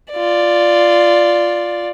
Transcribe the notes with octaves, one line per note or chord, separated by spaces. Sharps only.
F4 D5